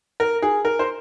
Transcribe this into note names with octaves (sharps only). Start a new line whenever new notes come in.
A#4
G#4
A#4
C5